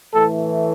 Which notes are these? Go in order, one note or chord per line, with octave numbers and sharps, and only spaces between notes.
A2 E3 A3 A4